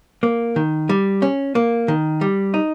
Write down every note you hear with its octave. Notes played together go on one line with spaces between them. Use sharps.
A#3
D#3
G3
C#4
A#3
D#3
G3
D#4